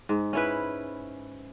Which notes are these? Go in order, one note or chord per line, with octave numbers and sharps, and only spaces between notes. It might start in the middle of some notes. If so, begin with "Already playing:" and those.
G#2
C#4 E4 B4